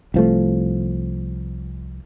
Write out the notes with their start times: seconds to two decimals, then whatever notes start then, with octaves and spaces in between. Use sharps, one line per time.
0.14 C2 F3 A3